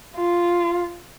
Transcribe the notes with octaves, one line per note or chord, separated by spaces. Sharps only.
F4